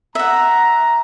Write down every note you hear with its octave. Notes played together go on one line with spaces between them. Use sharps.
E5 F#5 A#5